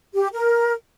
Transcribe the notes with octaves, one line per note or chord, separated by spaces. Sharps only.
G4
A#4